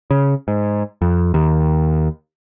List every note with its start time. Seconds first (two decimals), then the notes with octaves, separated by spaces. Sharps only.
0.10 C#3
0.48 G#2
1.02 F2
1.34 D#2